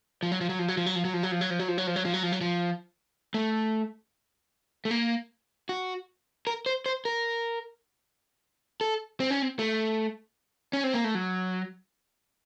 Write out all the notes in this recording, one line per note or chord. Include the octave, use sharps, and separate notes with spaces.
F3
F#3
F3
F#3
F3
F#3
F3
F#3
F3
F#3
F3
F#3
F3
F#3
F3
F#3
F3
F#3
F3
F#3
F3
F#3
F3
F#3
F3
A3
A3
A#3
F#4
A#4
C5
C5
A#4
A4
C4
C#4
C4
A3
C#4
C4
A#3
A3
F#3